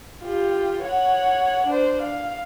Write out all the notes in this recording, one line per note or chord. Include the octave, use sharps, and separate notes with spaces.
F4 G4
C#5 F#5
D4 C5
F5